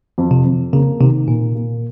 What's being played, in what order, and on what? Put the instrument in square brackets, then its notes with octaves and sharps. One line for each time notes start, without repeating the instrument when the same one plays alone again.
[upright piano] F2
[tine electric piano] C3
[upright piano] F2
[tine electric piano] C#3 [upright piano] A#3
[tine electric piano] C3 [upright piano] D#3
[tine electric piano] A#2 [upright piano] A#3
[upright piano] A#3